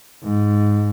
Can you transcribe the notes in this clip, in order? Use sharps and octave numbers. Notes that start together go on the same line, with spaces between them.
G#2